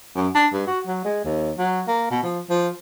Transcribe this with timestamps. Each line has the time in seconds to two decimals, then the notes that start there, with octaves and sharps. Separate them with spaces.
0.16 F#2
0.35 D4
0.53 G2
0.67 F#4
0.87 F#3
1.05 G#3
1.24 D#2
1.58 F#3
1.87 A#3
2.10 B2
2.23 F3
2.50 F3